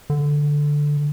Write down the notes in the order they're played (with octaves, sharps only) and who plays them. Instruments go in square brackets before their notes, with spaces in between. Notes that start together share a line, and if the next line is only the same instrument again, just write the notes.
[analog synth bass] D3